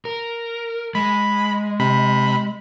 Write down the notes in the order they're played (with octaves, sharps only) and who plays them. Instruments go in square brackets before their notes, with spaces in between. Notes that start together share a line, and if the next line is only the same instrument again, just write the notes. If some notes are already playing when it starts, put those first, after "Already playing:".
[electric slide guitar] A#4
[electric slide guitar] G#3 [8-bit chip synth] B5
[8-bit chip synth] C3 B5